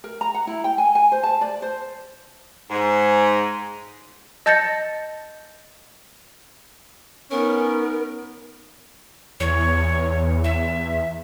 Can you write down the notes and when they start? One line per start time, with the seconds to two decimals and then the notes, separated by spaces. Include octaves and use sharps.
0.04 A#4
0.21 A#5
0.34 F#5
0.47 E4
0.64 G5
0.78 G#5
0.95 G#5
1.12 C5
1.23 A5
1.41 D5
1.62 C5
2.71 G#2
4.46 D#5 A5 G6 A6 A#6 C#7
7.31 B3 C#4 D#4 A#4
9.40 E2 C#5
10.44 E5